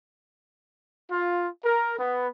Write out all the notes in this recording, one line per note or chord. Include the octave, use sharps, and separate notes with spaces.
F4
A#4
B3